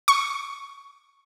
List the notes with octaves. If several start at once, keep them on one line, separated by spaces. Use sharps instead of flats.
C#6